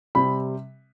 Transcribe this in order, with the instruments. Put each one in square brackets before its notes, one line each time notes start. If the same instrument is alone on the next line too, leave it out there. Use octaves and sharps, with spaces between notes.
[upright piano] C3 G3 C4 B5